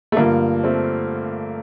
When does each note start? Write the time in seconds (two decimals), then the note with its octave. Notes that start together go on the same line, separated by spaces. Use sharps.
0.12 A3
0.17 G2 D3 F3 A#3
0.64 A3 C4